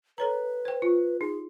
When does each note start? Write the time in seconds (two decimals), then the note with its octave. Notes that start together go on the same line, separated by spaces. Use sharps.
0.18 A4 B4 C#5 A#5
0.65 C5 G5
0.82 F4
1.21 D#4 G#4